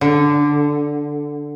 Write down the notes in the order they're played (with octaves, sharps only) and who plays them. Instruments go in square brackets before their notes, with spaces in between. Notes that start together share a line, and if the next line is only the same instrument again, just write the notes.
[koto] D3